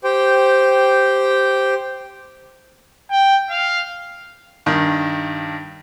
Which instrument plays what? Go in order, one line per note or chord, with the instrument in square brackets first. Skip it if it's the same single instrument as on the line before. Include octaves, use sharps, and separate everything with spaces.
[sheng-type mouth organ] G4 C5 G5
[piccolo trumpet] G5
F5
[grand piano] G2 D#3